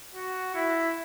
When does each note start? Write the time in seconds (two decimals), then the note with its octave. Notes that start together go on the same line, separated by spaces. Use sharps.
0.15 F#4
0.55 E4